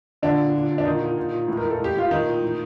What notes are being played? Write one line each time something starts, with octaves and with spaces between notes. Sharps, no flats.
A#2 D3 D4
A#2
A#2
A#2
D4
A#2 D#3 D#4
A#2
A#2
A#2
A2
A#4
A2
A4
A2 G4
A2 F4
A#2 D#3 D#4
A#2
A2